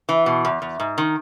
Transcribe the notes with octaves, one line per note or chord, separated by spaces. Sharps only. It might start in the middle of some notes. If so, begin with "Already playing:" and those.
E3
B2
E2
E2
G#2
D#3